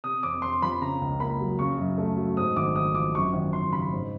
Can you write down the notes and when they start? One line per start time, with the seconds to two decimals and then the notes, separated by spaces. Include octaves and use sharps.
0.04 C3 D#6
0.23 F2 D6
0.42 F2 C6
0.62 F3 B5
0.81 C#3 A#5
1.01 C#2
1.20 A#3 B5
1.40 F#3
1.59 C#3 C#6
1.78 F#2
1.98 A3
2.17 F#3
2.37 G#2 D#6
2.56 G#1 D6
2.76 G#1 D#6
2.95 F3 D6
3.15 F#2 C#6
3.33 G#1
3.53 G#1 C6
3.72 C#3 B5
3.93 G#2